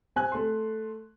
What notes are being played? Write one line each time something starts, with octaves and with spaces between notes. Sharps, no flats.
C4 G#5 F#6
A3 C6